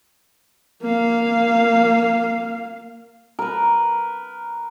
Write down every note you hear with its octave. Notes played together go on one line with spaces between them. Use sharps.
A#3 F5
A#4 B4